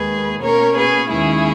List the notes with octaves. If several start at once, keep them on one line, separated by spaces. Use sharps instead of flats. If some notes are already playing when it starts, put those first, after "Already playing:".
Already playing: D#2 D#3 G#3 G#4 B4
B2 A#3 C#4 A#4 C#5
G#4 B4
D#2 D#3 G#3 C#4 E4 G#4